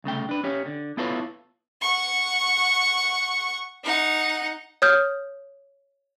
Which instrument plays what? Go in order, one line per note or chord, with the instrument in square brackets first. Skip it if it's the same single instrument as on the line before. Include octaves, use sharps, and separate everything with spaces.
[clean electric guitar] C2 C#3 A3 G5
D4 B4
C#4 G4 C#5
D3
B3 E4 F4 A4 B4 C#5
[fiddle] F#5 C#6
D#4 F#5
[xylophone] C#5 D#6 F6 G6